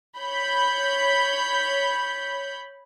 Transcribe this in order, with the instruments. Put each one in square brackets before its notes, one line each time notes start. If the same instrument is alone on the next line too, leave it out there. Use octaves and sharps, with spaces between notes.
[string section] C#5 B5 G6